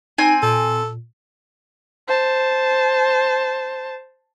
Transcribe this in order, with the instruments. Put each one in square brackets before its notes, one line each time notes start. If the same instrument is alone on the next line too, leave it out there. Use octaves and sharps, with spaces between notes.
[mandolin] C4 G#5 [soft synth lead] D#4
[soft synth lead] A#2 [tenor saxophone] A4
[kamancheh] C5 A5